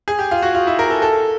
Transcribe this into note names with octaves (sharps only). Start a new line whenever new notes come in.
G#4
G4
F4
F#4
F4
E4
A#4
A4
A4